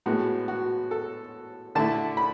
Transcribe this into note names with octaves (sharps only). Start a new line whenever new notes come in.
A2 G#3 B3 F#4
F#4
A4
D3 A3 E4 A5
B5